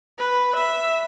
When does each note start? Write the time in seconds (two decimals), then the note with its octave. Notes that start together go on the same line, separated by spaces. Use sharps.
0.19 B4
0.56 E5